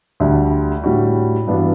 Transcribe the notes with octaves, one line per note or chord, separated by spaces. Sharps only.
D2 D3 G3 D4
A2 G3 D4 F#4
G2 E3 B3 D4 F#4